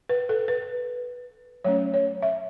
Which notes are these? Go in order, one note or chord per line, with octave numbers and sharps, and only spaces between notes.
B4
A4
B4
F#3 A3 C#4 C#5
C#5
E5